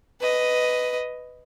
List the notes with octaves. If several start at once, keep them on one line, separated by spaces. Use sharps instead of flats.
B4 D#5